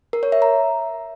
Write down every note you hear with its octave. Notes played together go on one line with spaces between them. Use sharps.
A#4
C#5
E5
A#5